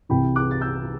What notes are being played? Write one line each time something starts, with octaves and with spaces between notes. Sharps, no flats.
C2 C3 E3 G5 B5
D6 F#6
A6
E6 G6